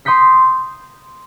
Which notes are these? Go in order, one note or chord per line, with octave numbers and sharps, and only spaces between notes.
C6 D#6 G6 B6 C#7